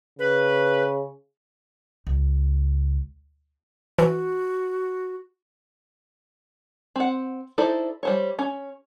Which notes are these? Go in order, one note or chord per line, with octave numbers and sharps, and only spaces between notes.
C#3 B4
C#2
E3 F#4
C4 F#5
D#4 E4 A4 C5 D5
G3 C5 C#5
C#4